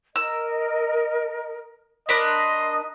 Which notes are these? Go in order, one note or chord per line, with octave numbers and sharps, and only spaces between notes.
A#4 D#5 E6
D4 A#4 D#5 B5 C6